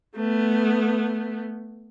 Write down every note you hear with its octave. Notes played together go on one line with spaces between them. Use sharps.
A3 B3